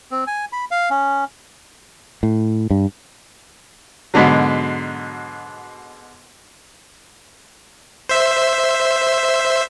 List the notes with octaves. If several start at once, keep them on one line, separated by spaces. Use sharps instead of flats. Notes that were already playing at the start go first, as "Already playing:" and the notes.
C4
G#5
B5
F5
C#4
A2
G2
G#2 B2 D3 F#3
C5 E5